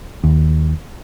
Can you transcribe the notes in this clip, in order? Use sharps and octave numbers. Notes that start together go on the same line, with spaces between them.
D#2